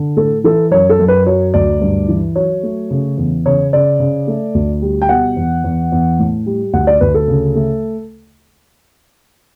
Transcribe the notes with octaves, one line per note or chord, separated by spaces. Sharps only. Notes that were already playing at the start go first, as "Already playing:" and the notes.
Already playing: D3
A2 A4
E3 A4
F#2 C#5
A4
F#2
B4
F#3 C#5
D2 D5
G2
E3
F#3 C#5
A3
C#3
E2
C#3 C#5
C#3 D5
C#3
A3
D2
G3
G5
B2 F#5
E2
E2
E2
A2
G3
D2 F#5
D5
D2 B4
A4
C#3
A3